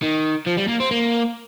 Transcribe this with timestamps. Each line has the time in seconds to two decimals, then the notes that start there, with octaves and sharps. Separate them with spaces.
0.02 D#3
0.46 F3
0.57 G3
0.68 A#3
0.80 C4
0.91 A#3